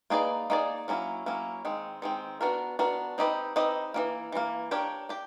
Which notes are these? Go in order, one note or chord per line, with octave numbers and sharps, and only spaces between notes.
A#3 D#4 G#4 B4 D5
A#3 D#4 G#4 B4 D5
F#3 A#3 C#4 E4
F#3 A#3 C#4 E4
D#3 G#3 C4
D#3 G#3 C4
B3 D4 F#4 A#4
B3 D4 F#4 A#4
C4 D#4 G4 B4 D#5
C4 D#4 G4 B4 D#5
E3 G3 A#3
E3 G3 A#3
D4 G4 A#4 C#5
D4 G4